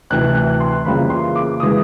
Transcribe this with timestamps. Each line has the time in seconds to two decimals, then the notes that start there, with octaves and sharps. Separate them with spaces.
0.10 D2 C3 E3 F#6
0.35 F#6
0.60 C6
0.85 F2 C#3 E3 G3 A#3 B5
1.10 C6
1.36 D6
1.60 E3 G#3 D#6